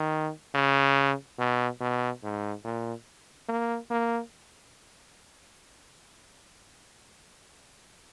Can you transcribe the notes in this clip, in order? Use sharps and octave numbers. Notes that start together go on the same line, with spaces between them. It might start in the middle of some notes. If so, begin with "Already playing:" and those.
Already playing: D#3
C#3
B2
B2
G#2
A#2
A#3
A#3